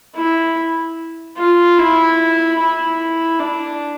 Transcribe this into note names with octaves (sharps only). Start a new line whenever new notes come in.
E4
F4
E4
E4
D4